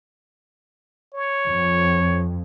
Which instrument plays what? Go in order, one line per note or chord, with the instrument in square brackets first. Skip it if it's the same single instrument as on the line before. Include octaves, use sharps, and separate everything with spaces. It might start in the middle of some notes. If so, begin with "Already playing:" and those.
[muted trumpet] C#5
[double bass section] F2